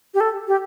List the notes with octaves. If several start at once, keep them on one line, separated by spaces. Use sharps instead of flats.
G4
A4
G4